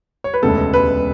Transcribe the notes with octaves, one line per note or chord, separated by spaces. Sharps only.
C#5
B4
E1 D2 C#3 G#3 B3 A4
B4